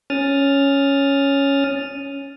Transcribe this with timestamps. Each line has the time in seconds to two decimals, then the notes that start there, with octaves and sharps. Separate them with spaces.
0.10 C#4 D#6 F6 A6